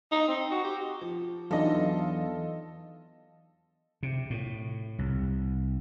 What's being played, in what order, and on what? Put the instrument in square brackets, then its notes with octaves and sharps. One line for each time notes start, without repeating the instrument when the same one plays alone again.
[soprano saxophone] D#4
C4
F#4
G4
[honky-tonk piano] F3
[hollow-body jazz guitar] E2 [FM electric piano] F#3 D4 D#4 [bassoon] F4 [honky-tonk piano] A4 D#5
[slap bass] C3
A2
C2